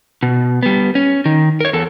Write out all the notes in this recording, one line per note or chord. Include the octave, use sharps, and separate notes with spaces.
B2
G3 B3
C#4
D#3
A#4 C#5
E2 A4